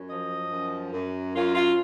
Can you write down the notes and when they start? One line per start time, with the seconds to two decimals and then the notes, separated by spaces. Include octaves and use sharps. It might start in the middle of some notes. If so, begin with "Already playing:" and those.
Already playing: F#2
0.10 F3 D#5
0.51 F#2
0.92 F#2
1.34 F#2 F4
1.55 F4